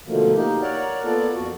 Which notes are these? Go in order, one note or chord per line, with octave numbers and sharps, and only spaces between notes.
B2 D3 D#3 F3 A3 A#3
A#3 D#4 G4
A#4 C#5 D5 F#5
A#3 B3 F4 A4 D5
F2 F#4